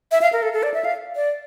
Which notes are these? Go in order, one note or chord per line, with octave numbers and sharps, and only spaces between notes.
E5
F5
A#4
A4
A4
D5
E5
F5
D5